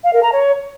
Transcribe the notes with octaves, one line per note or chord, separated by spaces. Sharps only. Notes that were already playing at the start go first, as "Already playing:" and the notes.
F5
A#4
A#5
C#5